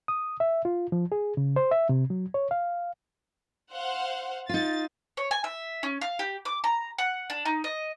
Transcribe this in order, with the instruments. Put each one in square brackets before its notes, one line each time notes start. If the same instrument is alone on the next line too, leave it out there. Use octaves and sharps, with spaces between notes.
[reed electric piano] D#6
E5
F4
F3
G#4
C#3
C5
E5
C3
F#3
C#5
F5
[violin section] C5 F5 F#5
[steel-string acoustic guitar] D#4 F4 [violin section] A6
[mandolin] C#5
G#5
E5
C#4
F5
G4
D6
A#5
F#5
D4
D#4
D#5